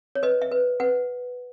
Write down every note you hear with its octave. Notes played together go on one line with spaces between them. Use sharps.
C#5
B4 D#5
E5
B4
B4 F#5